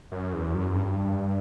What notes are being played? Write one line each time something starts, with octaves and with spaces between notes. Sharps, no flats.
F#2
E2
F#2
G2